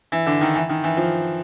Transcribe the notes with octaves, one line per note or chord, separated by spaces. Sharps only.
E3
D3
D#3
E3
D#3
E3
F3